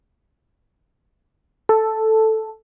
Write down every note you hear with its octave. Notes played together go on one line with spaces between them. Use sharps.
A4